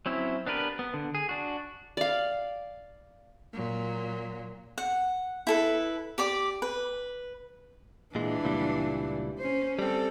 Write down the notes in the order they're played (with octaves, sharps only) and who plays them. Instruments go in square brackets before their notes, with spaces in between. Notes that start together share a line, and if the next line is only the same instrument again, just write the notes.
[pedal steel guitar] F#3 C4 C#4 E4
B3 D4 G4 A#4 B4
B3
D3
G#4
D4 F#4
[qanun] D5 F5
[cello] A#2 F#3
[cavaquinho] F#5
E4 A4 B4
G4 D5 D6
B4
[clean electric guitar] A#2 G#3 [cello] E3 D4
[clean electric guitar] C#2 A#2 G3
[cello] C#4 C5
[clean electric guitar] G3 C4 [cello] A4